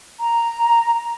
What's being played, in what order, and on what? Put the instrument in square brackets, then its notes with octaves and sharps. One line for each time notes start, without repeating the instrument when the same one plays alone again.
[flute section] A#5